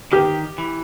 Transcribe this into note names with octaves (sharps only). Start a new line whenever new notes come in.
D#3 G4
E3